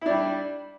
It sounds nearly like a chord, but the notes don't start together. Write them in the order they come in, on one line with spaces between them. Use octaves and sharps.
E4 D4 G3